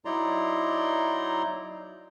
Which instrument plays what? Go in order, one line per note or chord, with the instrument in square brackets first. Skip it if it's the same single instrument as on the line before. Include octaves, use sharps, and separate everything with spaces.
[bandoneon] F#3 D#4 E4 D5 A#5 C6